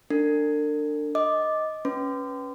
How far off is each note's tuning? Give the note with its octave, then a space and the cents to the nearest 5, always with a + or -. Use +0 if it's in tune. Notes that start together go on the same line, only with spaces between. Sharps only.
D4 +10 A#4 -45
D#5 +10 D6 +5
C#4 +0 B4 +0 C6 -35